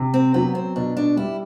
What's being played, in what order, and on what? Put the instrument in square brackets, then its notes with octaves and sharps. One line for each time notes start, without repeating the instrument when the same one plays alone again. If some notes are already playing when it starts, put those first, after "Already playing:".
Already playing: [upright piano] C3
[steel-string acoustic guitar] C4
[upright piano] F#3 [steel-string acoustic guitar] B3
[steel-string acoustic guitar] C4
[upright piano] B2 [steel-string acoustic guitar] D4
[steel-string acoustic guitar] D4
[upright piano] G3 [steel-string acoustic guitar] E4